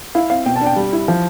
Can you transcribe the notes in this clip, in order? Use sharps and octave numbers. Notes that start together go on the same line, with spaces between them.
E4 F5
C4 F5
B2 G5
A5
D4
G5
G3
E4
F3